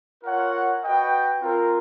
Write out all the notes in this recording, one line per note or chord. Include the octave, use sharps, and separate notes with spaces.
F4 A#4 C#5 F#5
F#4 B4 D#5 G5
C4 F4 A#4